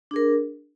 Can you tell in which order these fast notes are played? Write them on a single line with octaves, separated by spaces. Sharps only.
D4 G#4 A#4